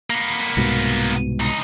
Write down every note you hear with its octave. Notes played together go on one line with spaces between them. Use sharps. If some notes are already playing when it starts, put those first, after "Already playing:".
A#3 B3
C2 G#2 B2
C#2 D#4